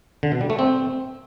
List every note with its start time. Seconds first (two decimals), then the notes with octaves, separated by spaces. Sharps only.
0.23 D3
0.32 B2
0.41 G3
0.50 A3
0.59 C4